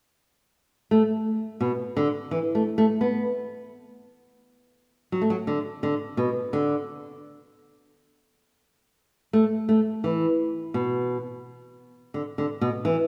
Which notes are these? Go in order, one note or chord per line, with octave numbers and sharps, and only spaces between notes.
A3
B2
D3
E3
A3
A3
B3
F#3
A3
F#3
D3
D3
B2
D3
A3
A3
E3
B2
D3
D3
B2
E3